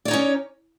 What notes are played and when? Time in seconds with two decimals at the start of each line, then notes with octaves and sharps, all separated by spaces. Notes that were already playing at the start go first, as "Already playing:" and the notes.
0.05 D5
0.08 C#5
0.11 D#4
0.13 C#4